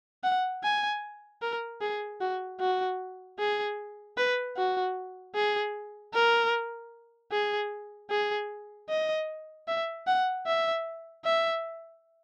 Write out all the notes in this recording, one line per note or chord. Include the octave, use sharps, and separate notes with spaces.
F#5
G#5
A#4
G#4
F#4
F#4
G#4
B4
F#4
G#4
A#4
G#4
G#4
D#5
E5
F#5
E5
E5